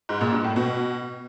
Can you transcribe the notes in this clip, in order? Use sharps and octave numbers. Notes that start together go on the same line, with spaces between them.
G#2
A#2
G2
A2
B2